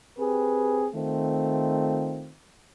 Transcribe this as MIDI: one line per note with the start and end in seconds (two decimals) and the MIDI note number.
0.17 0.87 60
0.17 0.87 67
0.17 0.87 68
0.17 0.87 71
0.94 2.33 51
0.94 2.33 57
0.94 2.33 60
0.94 2.33 65